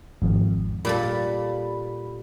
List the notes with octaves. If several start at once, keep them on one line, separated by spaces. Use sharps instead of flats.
G#1 F2
A#2 G3 A4 B5